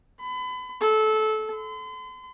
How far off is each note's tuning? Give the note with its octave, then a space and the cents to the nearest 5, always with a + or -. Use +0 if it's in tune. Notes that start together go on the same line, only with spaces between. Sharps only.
B5 +35
A4 -20
C6 -45